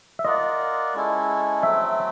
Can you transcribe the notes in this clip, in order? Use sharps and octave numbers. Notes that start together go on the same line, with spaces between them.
E5
F4 A#4 D5 D#5 F#5
G#3 C#4 E4 A4
F#3 A3 C4 E5